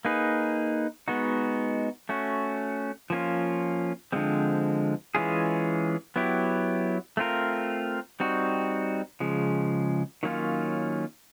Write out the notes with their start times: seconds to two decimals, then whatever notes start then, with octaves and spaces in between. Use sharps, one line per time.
0.05 A#3 D#4 G#4 B4
1.08 G#3 B3 D#4 F#4
2.09 A3 C#4 F#4
3.10 F3 A#3 C#4 F4
4.12 D3 F3 G#3 C4
5.15 E3 G#3 C#4 F4 G#4
6.16 F#3 B3 E4 G4
7.17 A3 C4 F4 A#4
8.20 G3 C4 D#4 F#4
9.20 C#3 F3 G#3
10.23 D#3 F#3 A#3 C#4 F4